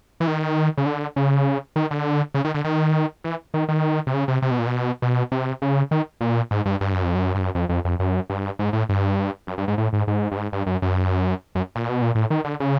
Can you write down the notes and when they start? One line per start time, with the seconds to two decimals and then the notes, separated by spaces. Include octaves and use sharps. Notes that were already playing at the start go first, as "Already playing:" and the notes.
0.20 E3
0.27 D#3
0.78 C#3
0.86 D3
1.16 C#3
1.76 D#3
1.91 D3
2.34 C#3
2.45 D#3
2.54 D3
2.64 D#3
3.24 E3
3.54 D#3
3.69 D#3
4.07 C3
4.14 C#3
4.28 C3
4.42 C3
4.51 B2
4.59 A#2
4.67 B2
5.02 B2
5.32 C3
5.62 C#3
5.91 D#3
6.21 A#2
6.51 G#2
6.66 G2
6.81 G2
6.92 F#2
7.03 F2
7.15 F#2
7.35 G2
7.40 F#2
7.55 F2
7.69 F2
7.85 F2
7.99 F#2
8.30 G2
8.59 G#2
8.73 A2
8.89 G2
9.47 F#2
9.58 G2
9.68 G#2
9.78 A2
9.93 G#2
10.07 G#2
10.32 G2
10.37 G#2
10.52 G2
10.66 F#2
10.82 F#2
11.55 F#2
11.75 A#2
11.89 B2
12.02 A#2
12.15 A2
12.30 D#3
12.44 D3
12.60 C#3